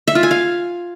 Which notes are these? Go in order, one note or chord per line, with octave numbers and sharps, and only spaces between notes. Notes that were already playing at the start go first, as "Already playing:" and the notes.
E5
F4
G#5
F5